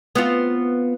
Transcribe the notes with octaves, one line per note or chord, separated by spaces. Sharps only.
B3 C4 F4